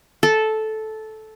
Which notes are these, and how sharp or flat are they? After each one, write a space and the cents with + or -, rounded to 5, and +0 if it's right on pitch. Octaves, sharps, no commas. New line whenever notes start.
A4 -10